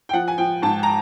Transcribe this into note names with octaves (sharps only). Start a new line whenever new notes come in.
G5
F3 F#5
G#5
F3 G5
G#2 A5
A#5